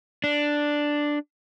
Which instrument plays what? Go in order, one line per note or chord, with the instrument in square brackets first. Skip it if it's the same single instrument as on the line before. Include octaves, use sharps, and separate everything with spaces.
[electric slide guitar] D4